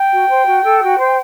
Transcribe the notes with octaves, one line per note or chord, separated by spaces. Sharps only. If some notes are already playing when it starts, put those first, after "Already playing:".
Already playing: G5
F#4
C5
F#4
A4
F#4
C5